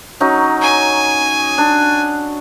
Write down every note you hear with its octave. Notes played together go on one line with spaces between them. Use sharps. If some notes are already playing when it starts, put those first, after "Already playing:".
F#3 C#4 D#4
G#5
D4